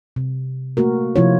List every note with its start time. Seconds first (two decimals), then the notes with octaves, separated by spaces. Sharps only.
0.16 C3
0.77 A3 A#3 F#4 A#4
1.16 C3 F3 E4 F4 C#5